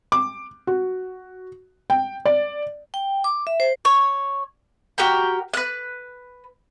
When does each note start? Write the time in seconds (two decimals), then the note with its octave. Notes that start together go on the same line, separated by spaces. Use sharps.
0.12 D6
0.67 F#4
1.90 G5
2.25 D5
2.94 G5
3.24 D6
3.47 E5
3.60 C5
3.85 C#5
4.98 F#4 G4 A#4 G5
5.54 B4 F#6